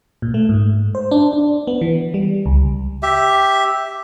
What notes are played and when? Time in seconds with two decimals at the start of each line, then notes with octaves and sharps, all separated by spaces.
0.22 A#2
0.34 A3
0.49 G#2
0.95 C5
1.11 D4
1.33 D4
1.67 B3
1.81 E3
2.14 G3
2.46 C#2
3.03 G4 E5